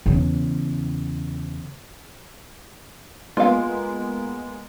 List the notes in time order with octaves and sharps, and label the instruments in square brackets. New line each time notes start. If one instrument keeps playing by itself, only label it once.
[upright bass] E2 C#3
[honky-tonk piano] G#3 A#3 B3 [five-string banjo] F4 F5